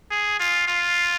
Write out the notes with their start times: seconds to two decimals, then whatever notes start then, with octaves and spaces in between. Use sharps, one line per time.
0.11 G#4
0.39 F4
0.68 F4